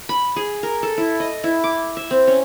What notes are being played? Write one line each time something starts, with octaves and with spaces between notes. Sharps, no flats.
B5
G#4
A#4
A4
E4
D#5
E4
D6
E5
C4
C#4